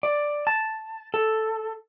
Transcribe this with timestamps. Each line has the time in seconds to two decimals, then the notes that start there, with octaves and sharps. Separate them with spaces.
0.03 D5
0.47 A5
1.14 A4